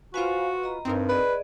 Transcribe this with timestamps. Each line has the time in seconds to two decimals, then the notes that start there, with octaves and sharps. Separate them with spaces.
0.14 F4 F#4 B4 C5 F5 G#5
0.63 D#5 A#5
0.85 G2 C4 D#4 A#4
1.09 G#4 B4 D5 D#5